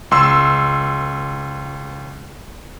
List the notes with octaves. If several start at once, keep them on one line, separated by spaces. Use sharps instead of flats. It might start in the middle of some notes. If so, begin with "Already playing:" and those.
C#2 C6 E6